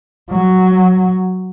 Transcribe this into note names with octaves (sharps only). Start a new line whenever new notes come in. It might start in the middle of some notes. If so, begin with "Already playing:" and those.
F#3